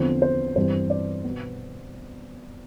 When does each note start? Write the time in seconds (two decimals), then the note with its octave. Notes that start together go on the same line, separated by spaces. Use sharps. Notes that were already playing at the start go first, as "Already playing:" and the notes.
Already playing: E2 D3 F3 C4 C5
0.22 C5
0.56 G2 E3 G3 C4 C5
0.90 D5
1.24 B2 B3